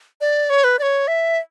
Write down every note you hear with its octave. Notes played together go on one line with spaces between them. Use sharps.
D5
C#5
B4
D5
C#5
E5